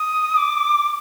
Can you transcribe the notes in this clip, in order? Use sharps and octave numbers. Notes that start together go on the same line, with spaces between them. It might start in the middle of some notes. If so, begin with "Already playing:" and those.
Already playing: D#6
D6